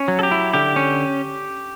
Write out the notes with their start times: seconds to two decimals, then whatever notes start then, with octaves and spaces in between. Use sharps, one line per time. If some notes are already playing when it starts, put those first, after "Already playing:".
Already playing: C#4
0.08 F#3
0.19 A4
0.23 G4
0.31 E4
0.53 D3 G4
0.76 C#4